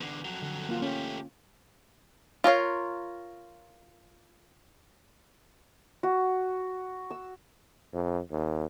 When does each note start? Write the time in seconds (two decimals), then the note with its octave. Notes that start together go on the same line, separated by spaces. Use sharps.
0.01 E2 D3
0.25 F2 F#3
0.42 D3
0.69 A#3 F4
0.82 A3 C#4 G4
2.44 F4 A#4 C#5 F5
6.03 F#4
7.11 E6
7.94 F2
8.31 D#2